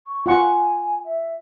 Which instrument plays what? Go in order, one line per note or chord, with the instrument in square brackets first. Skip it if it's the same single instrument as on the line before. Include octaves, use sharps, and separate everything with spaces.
[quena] C#6
[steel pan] F4 F#5 C#6 [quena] G#5
[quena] E5